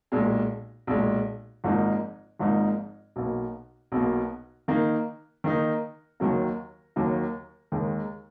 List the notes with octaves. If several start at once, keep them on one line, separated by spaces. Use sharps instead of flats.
B1 A#2 G#3
B1 A#2 G#3
G#1 G#2 F3 A#3 D#4
G#1 G#2 F3 A#3 D#4
B1 B2 A#3
B1 B2 A#3
D#3 A#3 D#4
D#3 A#3 D#4
D#2 D#3 F#3 A#3
D#2 D#3 F#3 A#3
D#2 D#3 G#3 D#4